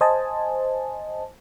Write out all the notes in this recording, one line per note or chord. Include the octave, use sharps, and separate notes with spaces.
C5 D#5 G#5 A5